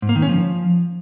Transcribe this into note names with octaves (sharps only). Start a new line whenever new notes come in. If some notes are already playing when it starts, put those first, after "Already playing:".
G#2
A#3
D#3
C#4
F3